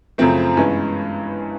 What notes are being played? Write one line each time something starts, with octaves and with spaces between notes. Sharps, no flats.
F#2 C#3 F3 A3 C4
G2 E3 G#3 B3 C#4